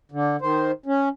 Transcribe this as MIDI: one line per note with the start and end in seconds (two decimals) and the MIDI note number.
0.12 0.36 50
0.41 0.71 51
0.41 0.71 72
0.86 1.09 61